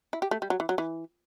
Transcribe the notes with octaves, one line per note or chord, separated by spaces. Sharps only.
E4
G4
A3
G3
F#3
E3
F#3
E3